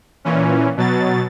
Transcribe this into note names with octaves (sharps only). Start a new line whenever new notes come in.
A#2 E3 C#4
B2 F#3 A6